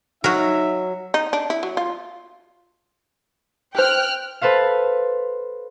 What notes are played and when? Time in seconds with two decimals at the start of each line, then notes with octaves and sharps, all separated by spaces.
0.24 F#3 D#4 F#4 A#4 E5
1.14 D#4
1.33 D4
1.50 E4
1.63 F#3
1.77 F4
3.75 G4 C5 G5 F6 F#6
4.42 A4 B4 C5 F5